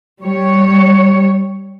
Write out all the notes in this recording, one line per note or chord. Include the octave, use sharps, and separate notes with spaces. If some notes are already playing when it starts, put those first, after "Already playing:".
G3 C#5